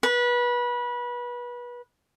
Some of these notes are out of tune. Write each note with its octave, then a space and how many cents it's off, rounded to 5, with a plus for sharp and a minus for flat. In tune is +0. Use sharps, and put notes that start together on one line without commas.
B4 -25